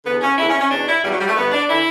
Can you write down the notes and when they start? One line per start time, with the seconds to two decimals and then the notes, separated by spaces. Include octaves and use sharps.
0.05 E2 D3 B3
0.21 C#4
0.38 E2 E4
0.41 D3
0.49 C#4
0.60 C#4
0.70 E2 B2 D4
0.87 E4
1.03 E2 B2 G3
1.11 F#3
1.20 G3
1.28 A3
1.36 G2 D3 B3
1.52 D4
1.69 D3 E4